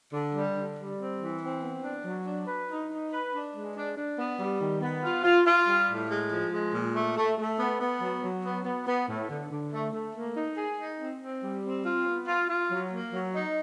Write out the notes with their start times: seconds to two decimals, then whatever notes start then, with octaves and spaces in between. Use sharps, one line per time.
0.13 D3
0.34 G3
0.57 D3
0.77 G3
0.99 C4
1.20 E3
1.41 C4
1.63 B3
1.83 D4
2.04 F#3
2.26 D4
2.47 B4
2.70 D#4
2.90 D#4
3.12 B4
3.33 D4
3.55 G#3
3.76 D4
3.97 D4
4.19 B3
4.39 G3
4.61 D#3
4.82 B3
5.03 F4
5.24 F4
5.46 F4
5.68 G3
5.88 A2
6.10 G#3
6.32 F3
6.52 G#3
6.73 A#2
6.96 A3
7.16 A3
7.38 A3
7.59 B3
7.81 B3
8.01 F#3
8.22 F#3
8.44 B3
8.65 B3
8.87 B3
9.08 A2
9.30 D3
9.51 D3
9.72 A3
9.93 A3
10.15 A#3
10.37 D#4
10.57 G#4
10.79 D#4
10.99 C4
11.21 C4
11.43 G3
11.63 C4
11.86 F4
12.07 B3
12.28 F4
12.49 F4
12.71 F#3
12.92 A#3
13.13 F#3
13.34 D#4